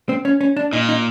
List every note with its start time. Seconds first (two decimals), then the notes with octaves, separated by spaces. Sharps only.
0.09 C4
0.25 C#4
0.41 C#4
0.57 D4
0.73 A#2 D#4
0.89 D#4